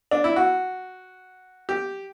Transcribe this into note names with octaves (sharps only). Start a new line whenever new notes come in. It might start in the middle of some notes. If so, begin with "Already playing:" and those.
D4
E4
F#4
G4